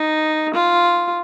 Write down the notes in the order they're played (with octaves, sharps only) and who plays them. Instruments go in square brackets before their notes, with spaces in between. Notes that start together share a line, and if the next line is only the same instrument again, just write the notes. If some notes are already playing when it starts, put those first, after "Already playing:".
Already playing: [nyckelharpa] D#4
F4